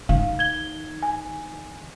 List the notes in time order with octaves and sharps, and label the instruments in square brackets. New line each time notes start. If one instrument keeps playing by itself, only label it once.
[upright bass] D#3 [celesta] F5
[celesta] G#6 G7
G#5